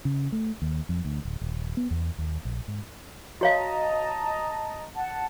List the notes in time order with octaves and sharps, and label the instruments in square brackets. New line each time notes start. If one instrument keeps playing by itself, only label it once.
[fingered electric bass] C#3
A3
D#2
F2
D2
D1
D#1
B3
E2
D#2
A#1
G#2
[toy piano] F#4 C#5 F5 [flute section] D#5 A5 A#5
[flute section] F#5 A5